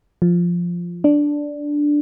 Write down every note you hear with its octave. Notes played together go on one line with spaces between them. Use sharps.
F3
D4